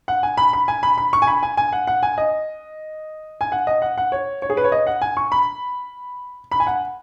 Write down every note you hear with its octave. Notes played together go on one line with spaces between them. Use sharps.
F#5
G#5
B5
B5
G#5
B5
B5
C#6
G#5
B5
G#5
G#5
F#5
F#5
G#5
D#5
G#5
F#5
D#5
F#5
F#5
C#5
C#5
G#4
B4
C#5
D#5
F#5
G#5
C#6
B5
B5
G#5
F#5